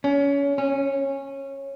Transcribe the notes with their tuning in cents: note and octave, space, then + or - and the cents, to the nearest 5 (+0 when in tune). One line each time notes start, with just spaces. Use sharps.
C#4 +25
C#4 -15